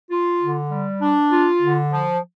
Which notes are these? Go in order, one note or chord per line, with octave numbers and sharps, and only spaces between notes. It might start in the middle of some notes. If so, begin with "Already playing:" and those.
F4
D3
G3
D4
F4
D3
F3